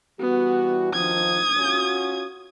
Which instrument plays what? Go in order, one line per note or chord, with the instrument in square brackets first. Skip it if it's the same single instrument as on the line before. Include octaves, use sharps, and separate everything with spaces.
[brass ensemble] E3 G3 F#4 [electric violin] B3
[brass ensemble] D#3 F3 [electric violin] D#6 G#6
[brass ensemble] C#4 F4 F#4